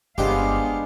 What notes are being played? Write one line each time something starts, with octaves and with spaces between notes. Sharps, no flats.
G1 G#3 B3 D4 G4 C5 D#5 F5